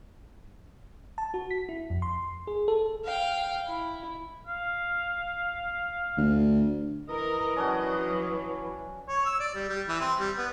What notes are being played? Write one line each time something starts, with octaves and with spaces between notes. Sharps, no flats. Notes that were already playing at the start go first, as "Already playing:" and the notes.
A5
F#4
B6
E4
F2
C6
G#4
A4
F5 G5
E4
F5
D2
E3 A#4 D#5
F#3 C#4 D4 F#4
C#5
E6
D5
G3
G3
E3
C4
G3
B3